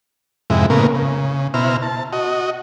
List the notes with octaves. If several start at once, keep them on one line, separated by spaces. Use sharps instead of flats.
F2 G#2 C3 G#3 E4
A2 C#3 A#3 B3 A#4
C#3
B2 E4 C5 A#5 F6
A5
F#4 D#5